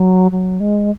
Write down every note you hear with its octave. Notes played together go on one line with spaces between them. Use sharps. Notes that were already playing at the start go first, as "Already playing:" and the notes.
Already playing: F#3
F#3
G#3